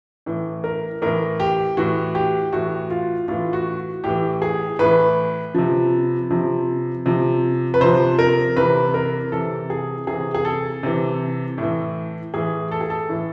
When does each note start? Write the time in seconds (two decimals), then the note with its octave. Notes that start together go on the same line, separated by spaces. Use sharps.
0.26 A2 E3
0.64 A#4
1.02 A2 E3 A#4
1.40 G4
1.77 A2 E3 F#4
2.15 G4
2.53 A2 E3 F#4
2.90 F4
3.28 A2 E3 F4
3.53 F#4
4.04 A2 E3 G4
4.42 G#4
4.79 A2 E3 B4
5.55 C3 F3
6.30 C3 F3
7.06 C3 F3
7.74 B4
7.81 C3 F3 C5
8.19 A#4
8.56 C3 E3 B4
8.94 A#4
9.32 C3 E3 A4
9.70 G#4
10.07 C3 E3 G#4
10.34 G#4
10.45 A4
10.83 C3 E3
11.58 A2 E3
12.34 A2 E3 G#4
12.71 A4
12.81 G#4
12.90 A4
13.09 A2 E3